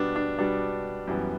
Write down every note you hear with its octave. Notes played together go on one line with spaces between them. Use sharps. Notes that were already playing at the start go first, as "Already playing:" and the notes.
Already playing: B2 G3 B3 D4
D4
B2 G3 B3 D4
F#2 E3 G3 B3